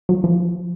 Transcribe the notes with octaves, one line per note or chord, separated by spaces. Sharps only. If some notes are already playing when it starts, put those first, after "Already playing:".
F#3
F3